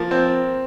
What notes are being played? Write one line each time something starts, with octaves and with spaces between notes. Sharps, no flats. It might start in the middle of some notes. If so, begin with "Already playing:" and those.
Already playing: F3 A#3
C4